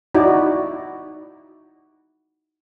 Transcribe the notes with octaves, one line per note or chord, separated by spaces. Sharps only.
D#4 E4 F#4 D5